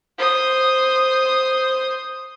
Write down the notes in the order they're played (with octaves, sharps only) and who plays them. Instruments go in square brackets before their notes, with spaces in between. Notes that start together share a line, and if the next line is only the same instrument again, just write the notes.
[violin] C5 D#6